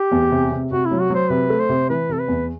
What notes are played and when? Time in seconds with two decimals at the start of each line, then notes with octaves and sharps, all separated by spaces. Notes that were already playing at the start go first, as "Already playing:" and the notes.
Already playing: G4
0.12 E2
0.32 C3
0.52 C3
0.71 C3 F#4
0.86 E4
0.91 F#3
1.01 F#4
1.10 F#3 C5
1.30 C3 B4
1.50 A3
1.60 C5
1.69 C3
1.90 E3 B4
2.09 C3 A4
2.19 B4
2.28 E2